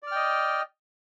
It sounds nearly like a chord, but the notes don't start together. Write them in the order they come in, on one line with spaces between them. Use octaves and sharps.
D5 F6 G5 D#5